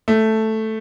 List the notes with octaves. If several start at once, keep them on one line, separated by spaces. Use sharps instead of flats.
A3